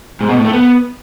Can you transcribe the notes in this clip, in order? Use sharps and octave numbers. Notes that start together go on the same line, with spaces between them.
G#2
B2
A2
A3
B3